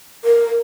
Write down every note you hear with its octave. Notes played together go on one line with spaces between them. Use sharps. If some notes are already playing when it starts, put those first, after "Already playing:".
A#4